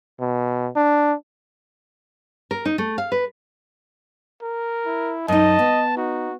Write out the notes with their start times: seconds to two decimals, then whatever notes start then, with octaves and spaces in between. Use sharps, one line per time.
0.20 B2
0.76 D4
2.51 A#4
2.65 D#4
2.78 A3
2.98 F5
3.12 B4
4.42 A#4
4.86 E4
5.28 F#2 D#4 D#5 A5
5.59 B3
5.97 D#4 F#4